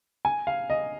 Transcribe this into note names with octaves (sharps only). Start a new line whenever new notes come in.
G#5
F5
D#5